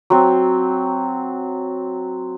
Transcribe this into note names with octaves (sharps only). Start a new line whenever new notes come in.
F#3 C4